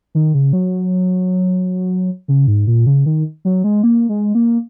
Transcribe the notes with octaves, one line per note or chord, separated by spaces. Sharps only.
D#3
C#3
F#3
C#3
G#2
A#2
C#3
D#3
F#3
G#3
A#3
G#3
A#3